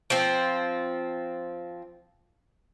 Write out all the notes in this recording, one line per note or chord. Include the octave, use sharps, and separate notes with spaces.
F3 C4